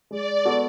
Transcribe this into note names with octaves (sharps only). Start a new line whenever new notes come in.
G#3 D5
B3 F#4 A4